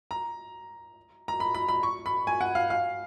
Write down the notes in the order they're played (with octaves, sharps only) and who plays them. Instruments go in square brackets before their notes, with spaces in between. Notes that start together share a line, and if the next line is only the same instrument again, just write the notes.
[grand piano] A#5
A#5
B5
B5
B5
C#6
B5
G#5
F#5
F5
F5